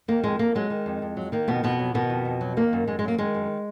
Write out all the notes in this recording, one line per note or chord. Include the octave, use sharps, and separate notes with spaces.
D#3 A#3
F2 G#3
F2 A#3
F#3 G#3
D#3
F2
F2
F#3
D#3 A#3
F2 B2 B3
F2 B2 B3
F#3
B2 D#3 B3
F2
F2
F#3
D#3 A#3
F#2
F#2 G#3
G#3
F#3 A#3
D#3 G#3
F#2